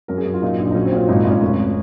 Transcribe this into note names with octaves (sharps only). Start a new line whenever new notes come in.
F#2 A#4
G#4
F#2
F4
A#2 D#4
A#1
D#4
F#3 C#4
C4
A#2 C#4
G#1 D#4
D#4
G#1
C#4
F1